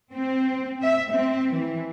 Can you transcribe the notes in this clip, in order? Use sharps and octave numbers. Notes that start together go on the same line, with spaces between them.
C4
E5
C4
E3